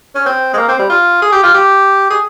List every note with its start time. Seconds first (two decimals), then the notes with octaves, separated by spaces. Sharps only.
0.15 C#4
0.26 C4
0.53 G#3
0.57 A#3
0.69 C4
0.79 G3
0.90 F4
1.22 G#4
1.32 G4
1.43 F4
1.54 G4
2.10 G#4